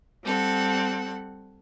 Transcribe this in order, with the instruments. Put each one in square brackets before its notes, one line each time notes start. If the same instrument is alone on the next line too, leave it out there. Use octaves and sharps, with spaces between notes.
[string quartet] G3 C4 A4 F#5